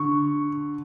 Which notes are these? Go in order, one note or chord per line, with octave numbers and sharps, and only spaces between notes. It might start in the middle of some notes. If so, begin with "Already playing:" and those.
Already playing: D3 C#6